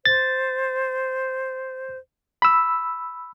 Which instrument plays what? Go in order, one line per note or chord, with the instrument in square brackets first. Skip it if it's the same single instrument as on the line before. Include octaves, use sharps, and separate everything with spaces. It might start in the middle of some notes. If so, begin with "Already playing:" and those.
[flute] C5 [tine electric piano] A6
[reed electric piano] B5 E6